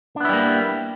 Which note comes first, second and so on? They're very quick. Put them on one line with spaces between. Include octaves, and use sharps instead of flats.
D4 B3 E4 G3 A#3